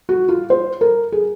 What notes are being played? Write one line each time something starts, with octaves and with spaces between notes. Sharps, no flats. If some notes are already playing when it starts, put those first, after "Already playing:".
F#4
F4
C5
A#4
G#4